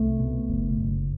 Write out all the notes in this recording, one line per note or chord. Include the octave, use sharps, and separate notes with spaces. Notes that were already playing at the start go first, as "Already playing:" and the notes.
Already playing: C2 A3
B2
F#1
F#1